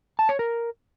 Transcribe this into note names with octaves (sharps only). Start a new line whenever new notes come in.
A5
C#5
A#4